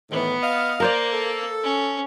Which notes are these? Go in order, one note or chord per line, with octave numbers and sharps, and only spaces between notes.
A2 D#3 E3 B3
D#5 F5
A#3 A#4 C5 D5
A4
C#4